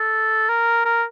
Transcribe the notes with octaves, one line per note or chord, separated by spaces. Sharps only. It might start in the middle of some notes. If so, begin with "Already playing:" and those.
Already playing: A4
A#4
A#4